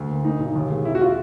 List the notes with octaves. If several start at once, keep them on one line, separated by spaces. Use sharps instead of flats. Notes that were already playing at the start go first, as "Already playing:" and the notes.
Already playing: D2 A3
A#3
A#3 D#4
B1
D#2
G#3
C3 E4
F#4
F4